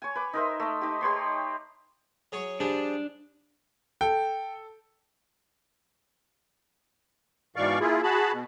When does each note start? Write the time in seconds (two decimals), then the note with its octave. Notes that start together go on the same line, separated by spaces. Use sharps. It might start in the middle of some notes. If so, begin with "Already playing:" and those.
0.02 C#5 G#5
0.15 B4 D6
0.33 D#4 A#4 C5 E5
0.60 A3 D#5
0.81 D#4 G4
1.01 G4 B4 C#5 C6
2.32 F#3 G#4 C#5
2.60 F3 G3 D4 G#4
4.01 A4 G5
7.56 G#2 B2 E3 D5 F5 C#6
7.80 A#3 E4 F4 G#4
8.03 F#4 G#4 A5 B5
8.32 B2